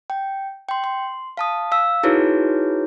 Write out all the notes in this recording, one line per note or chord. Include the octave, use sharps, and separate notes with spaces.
G5
G5 C6
C6
F5 A5 D#6
F5 E6
D#4 E4 F#4 G#4 B4 C#5